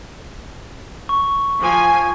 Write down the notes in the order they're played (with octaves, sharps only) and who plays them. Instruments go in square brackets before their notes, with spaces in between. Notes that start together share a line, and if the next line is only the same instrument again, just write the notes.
[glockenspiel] C#6
[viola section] F3 G#5